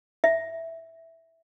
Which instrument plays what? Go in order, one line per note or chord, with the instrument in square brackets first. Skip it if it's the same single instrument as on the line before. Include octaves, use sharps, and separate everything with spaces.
[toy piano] E5